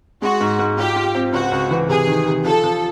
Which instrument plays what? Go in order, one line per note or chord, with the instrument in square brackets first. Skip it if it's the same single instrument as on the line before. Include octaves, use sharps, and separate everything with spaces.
[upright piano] G#3 [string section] F#4
[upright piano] G#2
G#2
[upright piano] F4 [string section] G4
[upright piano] F4
C4
[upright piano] C#2 [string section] F#4
[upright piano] C#2
E3
[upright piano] C3 [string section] G#4
[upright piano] D#3
C3
[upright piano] F3 [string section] A4
[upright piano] F3